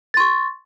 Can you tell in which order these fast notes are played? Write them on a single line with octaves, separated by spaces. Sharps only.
A6 C6 C#6